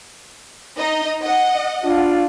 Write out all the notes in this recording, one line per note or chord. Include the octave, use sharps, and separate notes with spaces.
D#4 D#5
D#5 F#5
D4 F4